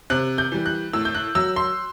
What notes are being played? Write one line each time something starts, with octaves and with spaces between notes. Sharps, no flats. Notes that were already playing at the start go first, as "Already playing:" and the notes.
C3 F#6
G6
E3 G3
F#6
A2 E6
G6
F#6
F#3 E6
C6